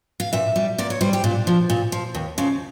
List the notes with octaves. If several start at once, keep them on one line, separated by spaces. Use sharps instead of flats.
F5
A#2 E5
G3
A#2 D5
C#5
G3 C5
G4
A#2 D4
F3
A#2
F3
D#2
C#3 F3